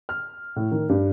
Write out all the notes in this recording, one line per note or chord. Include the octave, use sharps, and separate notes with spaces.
F6
A2
D#3
G2